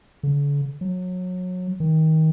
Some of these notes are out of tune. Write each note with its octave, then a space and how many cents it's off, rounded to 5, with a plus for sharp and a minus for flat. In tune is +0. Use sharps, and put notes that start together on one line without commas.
D3 -45
F#3 -25
D#3 +25